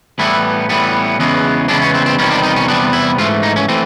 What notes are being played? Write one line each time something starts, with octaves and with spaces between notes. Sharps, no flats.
A2 E3 G3 B3 E4
A2 E3 G3 B3
E2 C#3 E3 G#3 B3
E2 C#3 E3 G#3 B3 D4
C#4
C4
C4
E2 C3 D#3 G3 B3 C#4
D4
D#4
C#4
E2 C3 D#3 G3 B3 D4
E4
G#2 E3 A3 F4
D#4
C#4
E3 A3 C4